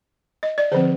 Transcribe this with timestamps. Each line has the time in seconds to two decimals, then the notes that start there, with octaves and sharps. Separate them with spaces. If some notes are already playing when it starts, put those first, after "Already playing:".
0.43 D#5
0.58 D5
0.72 D3 C5
0.74 F3 C4